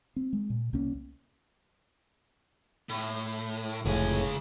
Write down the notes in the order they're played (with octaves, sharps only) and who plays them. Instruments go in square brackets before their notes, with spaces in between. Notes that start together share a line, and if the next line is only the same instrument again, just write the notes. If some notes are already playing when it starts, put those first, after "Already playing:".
[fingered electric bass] C4
G#3
A#2
C2 A#3 C#4
[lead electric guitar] A2
[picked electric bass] F1 A2 [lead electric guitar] C#2 G#4